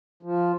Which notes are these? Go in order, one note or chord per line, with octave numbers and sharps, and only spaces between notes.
F3